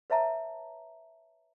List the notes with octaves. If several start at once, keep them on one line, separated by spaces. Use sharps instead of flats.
B4 C#5 E5 A5 A#5